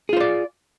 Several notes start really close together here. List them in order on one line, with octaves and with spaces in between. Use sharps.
G#4 F4 C5 D5